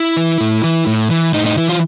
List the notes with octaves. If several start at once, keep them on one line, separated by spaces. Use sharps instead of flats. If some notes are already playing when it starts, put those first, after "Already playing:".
Already playing: E4
E3
A2
E3
A2
E3
A2 D#4
D#4
E3 E4
F4